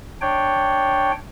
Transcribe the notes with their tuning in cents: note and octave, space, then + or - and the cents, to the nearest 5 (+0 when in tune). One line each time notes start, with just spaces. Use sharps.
D4 +0 C#5 +0 G5 +0